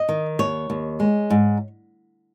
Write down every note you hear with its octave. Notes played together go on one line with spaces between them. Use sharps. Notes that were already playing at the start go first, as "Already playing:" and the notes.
Already playing: D#5
D#3
D#2 C#5
D#2
G#3
G#2